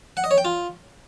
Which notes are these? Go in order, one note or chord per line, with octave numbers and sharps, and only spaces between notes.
F#5
D#5
C#5
G5
F4